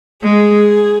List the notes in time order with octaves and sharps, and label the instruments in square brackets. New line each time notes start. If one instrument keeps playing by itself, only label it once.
[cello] G#3 [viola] G#4